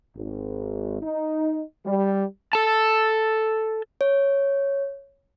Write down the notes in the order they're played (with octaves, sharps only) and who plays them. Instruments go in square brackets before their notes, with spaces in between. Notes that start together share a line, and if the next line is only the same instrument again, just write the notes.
[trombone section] G#1
D#4
G3
[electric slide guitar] A4 A5
[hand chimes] C#5